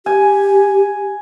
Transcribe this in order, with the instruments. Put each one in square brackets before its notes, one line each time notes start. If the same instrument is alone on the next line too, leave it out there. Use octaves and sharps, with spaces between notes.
[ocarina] G4 [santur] G#5